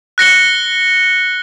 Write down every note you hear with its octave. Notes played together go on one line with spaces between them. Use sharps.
F#6 A#6 C#7 G7